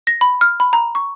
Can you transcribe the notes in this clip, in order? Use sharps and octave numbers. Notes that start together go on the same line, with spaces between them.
A#6
B5
F6
B5
A#5
C#6